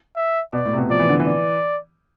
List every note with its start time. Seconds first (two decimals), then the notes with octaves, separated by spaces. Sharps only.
0.16 E5
0.53 B2 D5
0.65 A2
0.73 C3
0.78 B2
0.89 F3 D5
0.99 E3
1.09 D3
1.20 E3
1.27 D5